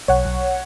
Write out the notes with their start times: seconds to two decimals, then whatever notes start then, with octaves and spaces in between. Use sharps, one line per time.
0.08 B1 C#5 F#5
0.25 B1